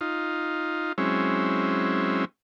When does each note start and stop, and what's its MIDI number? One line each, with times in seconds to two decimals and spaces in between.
0.01 0.93 63
0.01 0.93 65
0.98 2.25 54
0.98 2.25 56
0.98 2.25 60
0.98 2.25 61
0.98 2.25 64